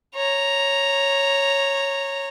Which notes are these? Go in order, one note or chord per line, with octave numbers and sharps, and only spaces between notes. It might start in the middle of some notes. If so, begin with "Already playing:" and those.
C#5 A#5